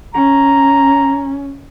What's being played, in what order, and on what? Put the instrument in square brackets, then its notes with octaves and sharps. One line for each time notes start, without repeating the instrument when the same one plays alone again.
[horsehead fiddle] C#4 [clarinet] A#5